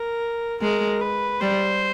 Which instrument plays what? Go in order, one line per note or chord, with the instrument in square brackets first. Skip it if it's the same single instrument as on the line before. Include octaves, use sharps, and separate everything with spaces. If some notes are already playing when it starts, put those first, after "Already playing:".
Already playing: [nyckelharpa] A#4
[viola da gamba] G#3 [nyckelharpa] A#4
[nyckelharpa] B4
[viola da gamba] G3 [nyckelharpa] C5